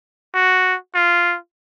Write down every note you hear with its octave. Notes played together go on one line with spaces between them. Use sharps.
F#4
F4